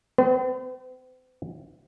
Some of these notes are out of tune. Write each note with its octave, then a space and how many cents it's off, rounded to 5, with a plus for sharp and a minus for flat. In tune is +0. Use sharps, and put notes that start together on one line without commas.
C4 -40 B4 +45